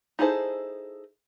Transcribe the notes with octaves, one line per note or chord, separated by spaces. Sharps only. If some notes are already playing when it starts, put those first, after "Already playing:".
D#4 E4 G#4 A4 C5